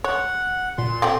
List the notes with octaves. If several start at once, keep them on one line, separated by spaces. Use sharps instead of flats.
C#5 F#5
A#2 C6
A3 C4 G4